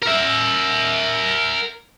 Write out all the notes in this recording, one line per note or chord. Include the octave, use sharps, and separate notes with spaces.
A#4 E5